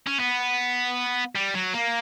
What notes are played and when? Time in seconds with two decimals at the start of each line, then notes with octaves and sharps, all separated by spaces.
0.06 C#4
0.20 B3
1.35 G3
1.55 F#3
1.74 A#3